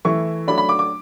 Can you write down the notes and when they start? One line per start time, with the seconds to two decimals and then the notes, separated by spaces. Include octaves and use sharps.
0.05 E3 A3 E4 C#6
0.47 F#3 A3 D4 B5
0.58 B5
0.69 D6
0.79 D6